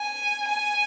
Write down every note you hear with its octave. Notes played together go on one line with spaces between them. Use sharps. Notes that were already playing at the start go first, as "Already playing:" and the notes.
Already playing: G#5
G#5